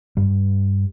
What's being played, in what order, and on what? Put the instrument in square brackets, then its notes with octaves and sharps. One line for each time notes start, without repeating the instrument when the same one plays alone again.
[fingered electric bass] G2 G3